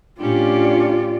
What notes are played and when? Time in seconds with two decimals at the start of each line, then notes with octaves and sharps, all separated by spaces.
0.20 A2 C#4 D4 F4 G4 D5